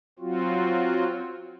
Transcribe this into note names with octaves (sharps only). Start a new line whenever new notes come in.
F#3 C4 F4 F#4